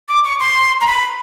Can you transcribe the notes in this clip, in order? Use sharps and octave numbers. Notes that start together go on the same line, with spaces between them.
D6
C#6
C6
A#5
B5